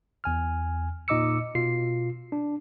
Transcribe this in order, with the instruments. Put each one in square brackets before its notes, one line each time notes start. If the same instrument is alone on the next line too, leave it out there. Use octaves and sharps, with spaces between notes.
[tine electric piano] E2 G#5 F6
A#2 D#4 D#5 D6 E6 C#7
B2 F4 C7
D4